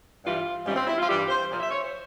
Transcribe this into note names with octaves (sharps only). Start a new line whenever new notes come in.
G2 E3 G3 F4
G#2 E3 G3 C#4
C4
E4
F4
G2 E3 G3 G4
C5
A#2 F3
E5
C#5
C5